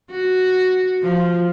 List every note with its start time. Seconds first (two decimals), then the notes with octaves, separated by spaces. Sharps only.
0.11 F#4
1.03 F3